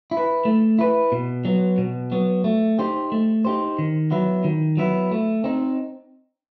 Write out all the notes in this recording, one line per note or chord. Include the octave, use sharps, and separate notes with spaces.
E4
B4
A3
E4 B4
B2
F#3 B3
B2
F#3 B3
A3
D#4 G4 C5
A3
D#4 G4 C5
D#3
F#3 B3 E4
D#3
F#3 B3 E4
A3
C4 D#4